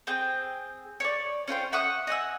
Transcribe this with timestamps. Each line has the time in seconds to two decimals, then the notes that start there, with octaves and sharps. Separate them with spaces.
0.07 C4 G#4 G5
1.00 C#5 D5
1.48 C#4 F4 C5 G5
1.72 E5 F#5 C#6 D#6
2.07 D#5 F#5 G#5 E6